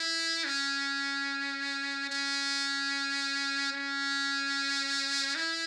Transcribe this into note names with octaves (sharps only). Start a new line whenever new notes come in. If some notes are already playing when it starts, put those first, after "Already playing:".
Already playing: E4
C#4
C#4
C#4
E4